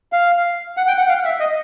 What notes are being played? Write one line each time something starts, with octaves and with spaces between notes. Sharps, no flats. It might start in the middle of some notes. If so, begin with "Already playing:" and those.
F5
F#5
G5
F#5
F5
E5
D#5